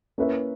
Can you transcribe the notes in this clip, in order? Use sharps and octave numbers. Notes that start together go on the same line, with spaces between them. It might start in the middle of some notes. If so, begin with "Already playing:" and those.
A#3 C#4 E4 B4 E5